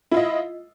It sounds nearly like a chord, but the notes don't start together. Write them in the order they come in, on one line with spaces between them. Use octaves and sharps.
E4 F4 D#5